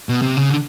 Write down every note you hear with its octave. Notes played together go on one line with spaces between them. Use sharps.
B2
C3
C#3
D3